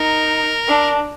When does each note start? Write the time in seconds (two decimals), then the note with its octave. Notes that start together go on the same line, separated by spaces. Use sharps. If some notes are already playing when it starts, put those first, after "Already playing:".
Already playing: D#4 A#4
0.68 D4